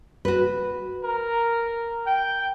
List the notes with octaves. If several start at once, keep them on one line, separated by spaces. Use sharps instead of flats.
F#4 B4
A#4
G5